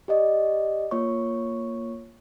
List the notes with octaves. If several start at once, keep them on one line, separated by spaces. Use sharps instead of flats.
G4 D5 D#5
A#3 F4 C#5 C#6